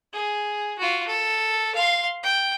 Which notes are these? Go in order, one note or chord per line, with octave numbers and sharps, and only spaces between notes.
G#4
F4 F#4
A4
F5 C6
G5